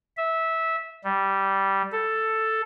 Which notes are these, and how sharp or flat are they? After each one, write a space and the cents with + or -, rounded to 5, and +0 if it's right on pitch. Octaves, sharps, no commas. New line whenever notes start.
E5 -15
G3 -10
A4 +5